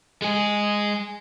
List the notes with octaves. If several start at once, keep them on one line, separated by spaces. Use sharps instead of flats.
G#3 G#4